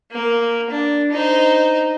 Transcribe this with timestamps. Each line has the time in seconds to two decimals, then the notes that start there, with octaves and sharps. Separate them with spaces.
0.12 A#3
0.70 D4
1.12 D#4 C5